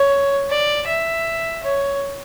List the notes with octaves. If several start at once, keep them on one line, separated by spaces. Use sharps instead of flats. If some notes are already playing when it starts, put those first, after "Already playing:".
Already playing: C#5
D5
E5
C#5